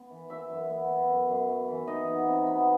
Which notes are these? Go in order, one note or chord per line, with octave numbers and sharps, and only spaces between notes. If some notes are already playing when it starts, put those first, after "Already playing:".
Already playing: B3
E3
E3 E5
F#2
B3
B3
F#2
F#2
F#2
E3
D#4 D#5
B3
C3
B3